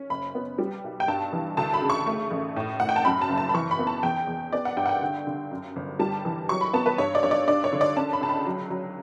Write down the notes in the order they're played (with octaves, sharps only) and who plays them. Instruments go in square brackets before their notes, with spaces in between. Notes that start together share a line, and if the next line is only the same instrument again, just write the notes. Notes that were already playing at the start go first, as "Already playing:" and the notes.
Already playing: [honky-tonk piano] C#4
F#1 B5
B3
G3
B1
G5
G2 A5
E3
D2 A5
B5
C#3
C#6
A3
A1
A2
A2 F#5
G5
A5
F#2 B5
A5
F#1
A5
B5
E3 C#6
B5
B3
A5
E2 G5
E2
B3 D5
F#5
G2 G5
F#5
G5
D3
D3
F#2
G1
G3 A5
E3
F#3 C#6
B5
B3 A5
B4
G2 C#5
D5
G2 C#5
D5
D4 D5
C#5
D3
D5
C#4 A5
B5
C#2 A5
B5
F#3
F#3